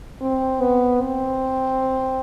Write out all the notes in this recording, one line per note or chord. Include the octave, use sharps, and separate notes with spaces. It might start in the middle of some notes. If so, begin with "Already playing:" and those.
C4
B3
C4